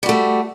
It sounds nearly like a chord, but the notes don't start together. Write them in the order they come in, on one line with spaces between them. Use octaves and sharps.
G3 F#4 A3